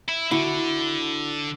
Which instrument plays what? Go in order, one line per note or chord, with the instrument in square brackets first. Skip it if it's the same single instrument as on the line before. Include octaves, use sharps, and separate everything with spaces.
[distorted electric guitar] E4
[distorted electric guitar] D3 [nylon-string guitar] E4 F#4